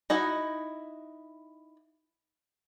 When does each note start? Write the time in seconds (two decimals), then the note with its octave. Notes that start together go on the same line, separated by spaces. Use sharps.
0.10 D#4 E4 F#4 D#5